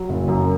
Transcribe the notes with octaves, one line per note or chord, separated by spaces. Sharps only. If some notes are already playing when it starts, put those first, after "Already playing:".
Already playing: F#3
F#1
F#2